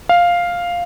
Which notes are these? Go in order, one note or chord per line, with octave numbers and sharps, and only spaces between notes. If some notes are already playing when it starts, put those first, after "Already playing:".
F5